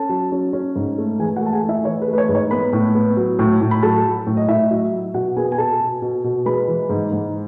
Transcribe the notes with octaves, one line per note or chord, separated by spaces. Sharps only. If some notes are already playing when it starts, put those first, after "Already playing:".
Already playing: C#4 A4 A5
F#3
C#4
C#4
G#2
A3
E3 G#4 G#5
F#4 F#5
A3
A5
G#4 G#5
A3
E4 E5
E3 C#5
B4
A3
B4
C#5
G#2 B4
C#5
B3 B4 B5
A2
B3
F#3
A2
A2
B5
F#3 A4 A5
F#3
A2
D#5
A2 E4 E5
F#3
F#3
B2 F#4 F#5
B3 G#4 G#5
G#5
B2 A4 A5
B2
B2
B2
G#3 B4 B5
E3
G#2
G#2